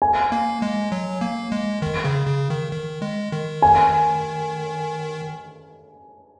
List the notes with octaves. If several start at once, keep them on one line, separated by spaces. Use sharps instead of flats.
G#5
A#3
G#3
F#3
A#3
G#3
D#3
C#3
C#3
D#3
D#3
G#3
D#3
G#5